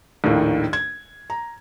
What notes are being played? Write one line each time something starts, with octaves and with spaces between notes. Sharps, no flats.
A#1 D#2 A2 D#3
G#6
A#5